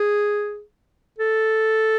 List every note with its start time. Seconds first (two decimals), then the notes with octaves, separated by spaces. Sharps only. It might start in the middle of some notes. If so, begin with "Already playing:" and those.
Already playing: G#4
1.19 A4